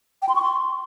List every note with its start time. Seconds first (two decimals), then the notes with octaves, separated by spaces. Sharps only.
0.22 G5
0.29 C6
0.36 C#6
0.42 C6